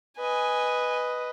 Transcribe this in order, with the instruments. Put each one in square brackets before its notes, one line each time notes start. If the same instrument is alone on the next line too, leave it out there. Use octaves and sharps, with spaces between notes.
[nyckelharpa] B4 D#5 [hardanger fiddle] G#5